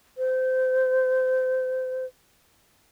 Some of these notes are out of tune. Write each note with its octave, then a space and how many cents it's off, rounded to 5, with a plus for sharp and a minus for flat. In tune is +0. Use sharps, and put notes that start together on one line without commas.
C5 -25